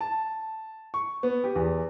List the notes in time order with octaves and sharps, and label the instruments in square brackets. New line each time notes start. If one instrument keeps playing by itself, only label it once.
[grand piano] A5
C#6
B3
G4
E2